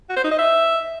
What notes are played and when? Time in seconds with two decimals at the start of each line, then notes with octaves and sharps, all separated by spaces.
0.09 F#4
0.17 C5
0.24 D#4
0.31 D#5
0.39 E5